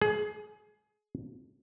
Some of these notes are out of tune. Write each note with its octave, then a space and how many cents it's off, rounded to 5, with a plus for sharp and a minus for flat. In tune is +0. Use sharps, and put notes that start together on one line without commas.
G#4 +25